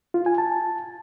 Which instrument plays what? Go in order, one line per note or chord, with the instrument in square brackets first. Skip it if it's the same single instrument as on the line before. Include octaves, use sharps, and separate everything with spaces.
[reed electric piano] F4
G#5
A5